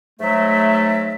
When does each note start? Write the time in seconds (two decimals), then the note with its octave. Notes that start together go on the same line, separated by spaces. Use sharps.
0.20 G#2 F#3 A3 E5